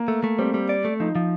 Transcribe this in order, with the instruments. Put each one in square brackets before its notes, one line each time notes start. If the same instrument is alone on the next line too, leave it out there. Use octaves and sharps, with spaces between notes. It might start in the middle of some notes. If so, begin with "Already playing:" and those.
Already playing: [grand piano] A#3
[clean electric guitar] A3
A3
[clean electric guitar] G3 [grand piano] C4
[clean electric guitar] G3
D5
A3
[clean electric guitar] F3 [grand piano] D#4
[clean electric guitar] F3